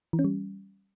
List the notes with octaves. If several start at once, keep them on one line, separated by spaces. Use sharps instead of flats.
E3
C#4
G3